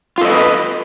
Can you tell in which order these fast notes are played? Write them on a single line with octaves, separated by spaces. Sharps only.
F4 A4 D#5 B4